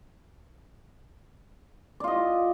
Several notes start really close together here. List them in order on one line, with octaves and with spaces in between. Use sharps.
D5 F4 D#5